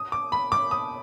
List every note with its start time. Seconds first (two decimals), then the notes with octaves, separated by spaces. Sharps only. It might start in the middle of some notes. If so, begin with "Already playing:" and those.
Already playing: D#6
0.12 D6
0.32 B5
0.52 D6
0.71 D#6